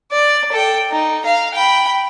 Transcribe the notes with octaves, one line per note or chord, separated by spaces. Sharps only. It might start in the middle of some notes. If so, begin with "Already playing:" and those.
D5
A4 G5
D#4
F5 A#5
G5 B5